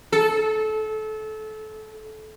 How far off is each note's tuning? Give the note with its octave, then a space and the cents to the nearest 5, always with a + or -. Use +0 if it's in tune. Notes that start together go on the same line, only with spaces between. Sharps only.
A4 -25